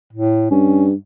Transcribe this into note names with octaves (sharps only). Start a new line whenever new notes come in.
A2
G2 C#4